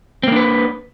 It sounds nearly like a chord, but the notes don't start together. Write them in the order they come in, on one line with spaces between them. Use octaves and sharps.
C4 A#3 D4 B4